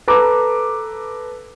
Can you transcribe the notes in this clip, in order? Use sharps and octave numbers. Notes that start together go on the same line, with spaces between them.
A4 B4 A#5 D6